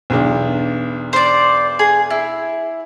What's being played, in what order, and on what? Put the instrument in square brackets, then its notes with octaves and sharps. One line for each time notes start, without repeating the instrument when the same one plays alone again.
[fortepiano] B1 E2 D4
[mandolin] C5 D5
G#4
E4